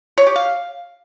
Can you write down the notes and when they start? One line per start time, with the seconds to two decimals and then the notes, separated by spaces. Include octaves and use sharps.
0.18 C#5
0.27 G4
0.36 F5